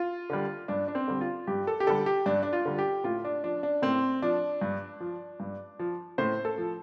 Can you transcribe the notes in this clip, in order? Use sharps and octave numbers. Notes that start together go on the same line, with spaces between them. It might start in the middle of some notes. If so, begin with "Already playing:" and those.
Already playing: F4
D3 G3
G2 D4
D4
C4
D3 G3
F4
G2 G4
A4
G4
D3 G3 A4
G4
G2 D4
D4
F4
D3 G3
G4
A2 F4
D4
F3 D4
D4
A2 C4
F3 D4
G2
F3
G2
F3
A2 C5
A4
F3